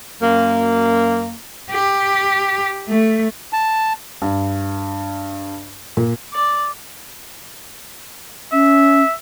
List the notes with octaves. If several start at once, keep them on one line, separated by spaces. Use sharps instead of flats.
F#2 A#3
G4
A3
A5
G2
A#2
D5
C#4 E5